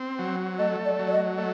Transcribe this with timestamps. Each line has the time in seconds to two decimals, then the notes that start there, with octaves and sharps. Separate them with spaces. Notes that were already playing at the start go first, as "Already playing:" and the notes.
Already playing: C4
0.19 F#3
0.59 A3 D#5
0.85 D5
0.99 F#3
1.08 D5
1.12 D#5
1.38 A3